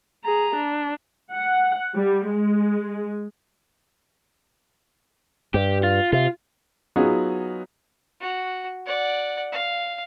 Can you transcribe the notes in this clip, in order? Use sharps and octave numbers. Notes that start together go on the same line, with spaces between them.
G#4 A#5
D4
F#5
G3
G#3
G2 G4
F4
C3 F4
F#3 B3 D#4 F4 F#4 G#4
F#4
D5 F#5
F5